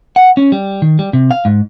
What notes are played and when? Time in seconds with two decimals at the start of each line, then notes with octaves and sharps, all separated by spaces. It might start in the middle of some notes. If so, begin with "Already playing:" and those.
0.16 F#5
0.37 C#4
0.52 G3
0.82 D#3
0.99 G3
1.13 C3
1.31 F5
1.45 G#2